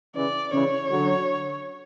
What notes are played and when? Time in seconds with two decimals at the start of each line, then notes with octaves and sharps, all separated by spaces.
0.16 C#3 E3 D5
0.53 C#3 E3 C#5
0.91 D3 F#3